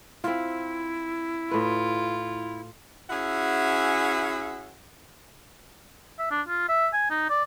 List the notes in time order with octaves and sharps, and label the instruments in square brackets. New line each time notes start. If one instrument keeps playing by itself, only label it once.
[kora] C4 F4 [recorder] E4
[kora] A2 B4 [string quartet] F4
[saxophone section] C#4 E4 F#4 G#4 E5 F#5
[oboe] E5
D4
F4
E5
G#5
D#4
D5